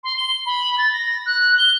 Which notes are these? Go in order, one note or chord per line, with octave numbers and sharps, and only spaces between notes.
C6
G7
B5
A6
A#6
F#6
G7